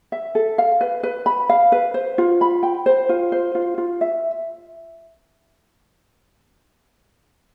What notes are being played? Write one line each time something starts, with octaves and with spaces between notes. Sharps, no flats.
E5
A4
F5
B4
B4
B5
F5
B4
C5
F4
B5
G5
C5
F4
C5
F4
F4
E5